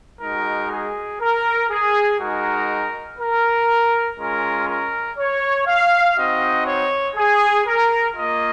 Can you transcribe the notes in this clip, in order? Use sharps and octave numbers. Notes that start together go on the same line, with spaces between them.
G#3 D#4 F#4 A#4
G#4
A#4
G#4
G#3 D#4 F#4 A#4
A#4
G#3 C#4 F4 A#4
A#4
C#5
F5
C4 D#4 F#4 D#5
C#5
G#4
A#4
A#3 F4 D#5